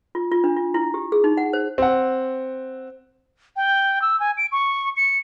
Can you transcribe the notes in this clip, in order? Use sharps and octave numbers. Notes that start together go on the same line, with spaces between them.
F4
F4
D4
F4
E4
G4
G#4
D#4
F#5
C5
C4 F#5
G5
E6
G#5
D7
C#6
C#7